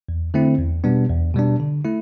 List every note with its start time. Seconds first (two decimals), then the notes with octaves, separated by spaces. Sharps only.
0.09 E2
0.34 D3 A3 C4 E4
0.59 E2
0.84 B2 G3 B3 D4
1.10 E2
1.34 B2 G3 B3 D4
1.60 D3
1.85 A3 E4